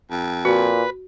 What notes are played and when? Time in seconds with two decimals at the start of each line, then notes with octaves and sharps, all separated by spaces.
0.11 F2
0.45 A#2 F#4 B4